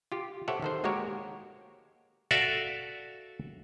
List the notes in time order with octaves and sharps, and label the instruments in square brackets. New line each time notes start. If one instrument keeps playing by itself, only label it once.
[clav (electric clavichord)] F4 G4
G4 A4 C5 C#5 E5 F#5
D#3 A4 C5
G#3 A#3 F#4 G4 A#4 C#5
F#4 A4 D5 E5 F5